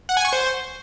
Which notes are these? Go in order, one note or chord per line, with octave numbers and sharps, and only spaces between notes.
F#5
G#5
C#6
C5